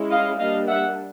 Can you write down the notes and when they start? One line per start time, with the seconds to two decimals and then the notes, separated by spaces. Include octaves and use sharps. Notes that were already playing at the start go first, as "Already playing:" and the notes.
Already playing: G#3 C#4 E4
0.10 D#5 F5
0.39 G3 A#3 D4 D#5 F5
0.68 E5 F#5